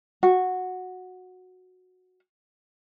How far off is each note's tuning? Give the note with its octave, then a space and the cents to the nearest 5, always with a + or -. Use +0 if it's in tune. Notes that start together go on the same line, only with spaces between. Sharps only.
F#4 -10